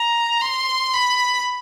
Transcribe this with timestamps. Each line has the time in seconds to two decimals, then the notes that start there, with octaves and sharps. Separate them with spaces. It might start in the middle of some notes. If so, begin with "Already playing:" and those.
Already playing: A#5
0.41 C6
0.94 B5